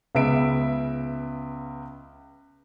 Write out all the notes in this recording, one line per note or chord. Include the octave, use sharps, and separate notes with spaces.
C#2 C#3 B3 E5 D7